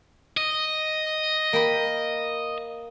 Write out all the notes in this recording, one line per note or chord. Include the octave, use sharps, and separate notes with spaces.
D#5
A#3 G5 B5